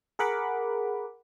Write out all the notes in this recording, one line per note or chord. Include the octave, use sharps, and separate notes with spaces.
G#4 A#4 F#5 B5 D6